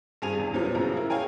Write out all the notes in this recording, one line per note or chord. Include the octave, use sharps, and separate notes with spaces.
G2 C3 G#4 G#5 D#7 F7
E2
F#2 A#2 F3 G3 B3
A1 F#2 C#3 F3 B3 A#5
E4 A#4
G#4 C#5 F5 G5 G#5 A#5